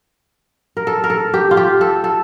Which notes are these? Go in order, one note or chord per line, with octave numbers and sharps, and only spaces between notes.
A#4
A4
A#4
A4
G4
F4
G4
A4
A4